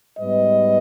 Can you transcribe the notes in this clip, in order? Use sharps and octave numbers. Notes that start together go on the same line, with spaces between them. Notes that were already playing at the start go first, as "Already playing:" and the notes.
G#2 G3 B3 B4 D#5